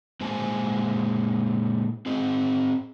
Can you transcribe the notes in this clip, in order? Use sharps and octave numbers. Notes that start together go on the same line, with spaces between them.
A#2 G#3 C5 G#5 A5
C4 G#4 D#5